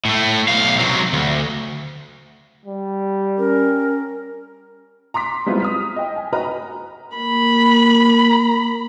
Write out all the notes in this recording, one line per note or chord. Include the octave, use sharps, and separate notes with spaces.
A2 A3
B1 F5
C3 F#3
D2
G3
C#4 A#4
A#5 C6 D6 B6
G3 G#3 B3 C4 E4 F4
D#6 F6 B6
D#5 G5
G#5
F#4 B4 D#5 A#5 B5 F6
A#3 B5